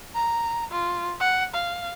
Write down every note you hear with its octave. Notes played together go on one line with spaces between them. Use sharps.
A#5
F4
F#5
F5